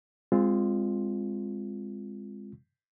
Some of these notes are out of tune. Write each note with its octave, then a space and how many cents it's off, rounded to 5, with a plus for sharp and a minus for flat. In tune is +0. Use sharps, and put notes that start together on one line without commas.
G#3 -25 C4 +0 F4 +0